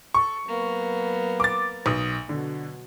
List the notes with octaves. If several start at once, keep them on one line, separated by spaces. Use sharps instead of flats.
A4 C#6
F#3 A#3 B3
D6 A6
B1 D#6
B2 D3 F#3